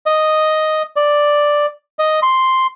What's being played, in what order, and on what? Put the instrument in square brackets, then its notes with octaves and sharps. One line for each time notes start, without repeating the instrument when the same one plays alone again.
[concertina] D#5
D5
D#5
C6